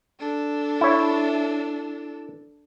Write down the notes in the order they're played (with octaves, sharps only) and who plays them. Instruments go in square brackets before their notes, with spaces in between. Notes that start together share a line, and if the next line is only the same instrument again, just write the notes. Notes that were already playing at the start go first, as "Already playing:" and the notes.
[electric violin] D4 A4
[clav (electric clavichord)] E4 C#5